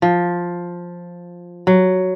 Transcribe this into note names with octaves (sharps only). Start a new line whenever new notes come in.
F3
F#3